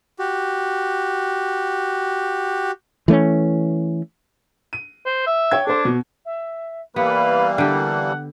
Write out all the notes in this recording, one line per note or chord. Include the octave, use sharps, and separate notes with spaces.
F#4 G4
E3 A3 C4 C#4
D#7
C5
E5
C#5 G5 G#6
D4 A4 C5
B2
E5
E3 G3 A#3 B3 B4 F5
D3 G4 F#5 A5